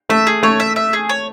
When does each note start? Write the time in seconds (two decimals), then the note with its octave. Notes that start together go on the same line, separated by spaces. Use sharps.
0.09 A3 E5
0.27 G#4
0.43 A3 C#5
0.60 E5
0.76 E5
0.93 G#4
1.09 C#5